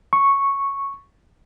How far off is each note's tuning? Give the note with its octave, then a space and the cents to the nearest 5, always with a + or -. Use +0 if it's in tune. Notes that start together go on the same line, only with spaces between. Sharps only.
C#6 -5